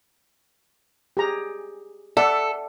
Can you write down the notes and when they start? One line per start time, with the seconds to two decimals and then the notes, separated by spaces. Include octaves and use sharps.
1.17 G4 G#4 A#5
2.17 A4 D5 E5 F#5